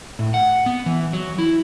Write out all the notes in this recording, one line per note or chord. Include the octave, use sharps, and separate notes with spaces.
A2
F#5
B3
E3
F#3
E4